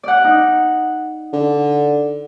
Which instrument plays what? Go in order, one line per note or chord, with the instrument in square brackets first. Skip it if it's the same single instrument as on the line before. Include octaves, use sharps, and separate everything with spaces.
[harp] D5 F#5
D#4
[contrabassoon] D3